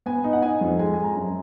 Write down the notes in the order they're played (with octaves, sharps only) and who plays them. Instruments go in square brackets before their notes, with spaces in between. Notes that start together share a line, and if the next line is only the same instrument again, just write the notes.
[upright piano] B3 G#5
D#4
F#5
D#4 G#5
F2
G#3 G#5
G#3 G#5
A#5
F#2